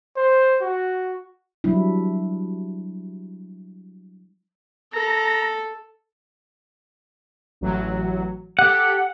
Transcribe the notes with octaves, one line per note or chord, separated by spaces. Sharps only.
C5
F#4
F#3 G3 D4 E4
A4 A#5
A1 F#3
G4 A4 F#5